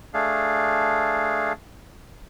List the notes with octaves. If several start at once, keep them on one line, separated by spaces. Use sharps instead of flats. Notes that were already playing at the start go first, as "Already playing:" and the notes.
A3 D4 G#4 F5